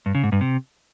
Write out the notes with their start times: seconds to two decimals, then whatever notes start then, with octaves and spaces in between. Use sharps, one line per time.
0.06 G2
0.15 C#3
0.23 G#2
0.32 G2
0.41 C3